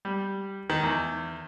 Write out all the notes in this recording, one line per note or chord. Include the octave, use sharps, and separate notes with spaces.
G3
D#3
E2